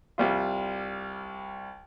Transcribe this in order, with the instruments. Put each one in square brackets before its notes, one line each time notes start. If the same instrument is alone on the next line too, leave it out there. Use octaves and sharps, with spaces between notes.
[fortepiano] C2 G3 F4